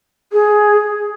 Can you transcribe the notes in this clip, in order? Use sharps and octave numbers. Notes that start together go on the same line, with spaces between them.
G#4